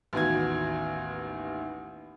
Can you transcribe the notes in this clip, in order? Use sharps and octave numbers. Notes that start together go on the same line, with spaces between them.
A1 D#2 B3 F#4 G#6